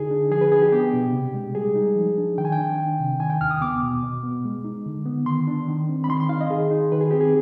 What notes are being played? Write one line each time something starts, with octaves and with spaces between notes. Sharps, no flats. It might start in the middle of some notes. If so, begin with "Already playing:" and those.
Already playing: D3 D#4 G#4
D4
F3 G#4
B4
D4 G#4
G4
B3 G4
B2
C3
G#3
G3 G#4
D#4
F3
D4
D#3 G5
G#5
G5
D4
D#3
C3
D#3 G#5
G5
D#2 F6
D#6
B3 D6
B2
B2
B3
G#3
D#4
D3
B3
D#3 C6
D4
D#3
C4
B5
D#3 C6
C6
D#4 F5
D#5
D#3 G#4
D#4
D#3 B4
G#4
C4 G4
G#4